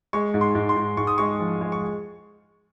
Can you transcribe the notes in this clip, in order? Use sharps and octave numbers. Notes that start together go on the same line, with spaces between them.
G#3 C#6
G#2
C6
G#2
C6
G#2
G#2 C#6
D#6
G#3 C#6
F3
G#3
C#6